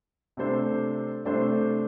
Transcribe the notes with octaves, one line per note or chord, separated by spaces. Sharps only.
C3 A3 D4 A4 C5
C3 A3 D4 A4 C5